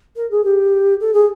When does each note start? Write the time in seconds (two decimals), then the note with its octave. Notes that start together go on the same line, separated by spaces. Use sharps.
0.16 A#4
0.31 G#4
0.44 G4
1.00 A4
1.14 G#4